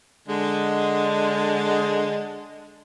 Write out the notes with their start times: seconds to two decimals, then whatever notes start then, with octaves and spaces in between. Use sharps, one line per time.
0.28 D3 G#3